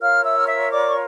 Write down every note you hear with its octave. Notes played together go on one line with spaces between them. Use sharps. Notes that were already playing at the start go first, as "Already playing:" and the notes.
F4 A#4 C#5 F5 F6
E5 E6
F6
E5 E6
D5 D6
C#6